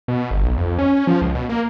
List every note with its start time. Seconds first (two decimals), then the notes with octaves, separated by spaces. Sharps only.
0.08 B2
0.31 G1
0.44 B1
0.57 F2
0.79 C#4
1.07 F3
1.21 C#2
1.35 B2
1.49 A#3